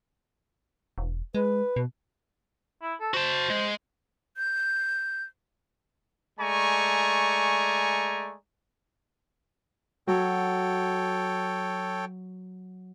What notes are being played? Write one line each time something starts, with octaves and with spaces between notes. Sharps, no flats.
E1
G#3 B4
B2
E4
A4
F#4 C5 A5
G#3
G6
G#3 A3 D5 G#5 A#5 C#6
F#3 A4 C#5 G5